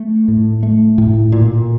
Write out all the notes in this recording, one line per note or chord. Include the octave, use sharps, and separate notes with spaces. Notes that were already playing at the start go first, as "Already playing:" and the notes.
Already playing: A3
A2
A3
A2
A#2